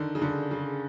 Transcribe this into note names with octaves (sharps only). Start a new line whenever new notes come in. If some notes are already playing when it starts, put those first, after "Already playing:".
Already playing: D3 D#3
C#3
D3
C#3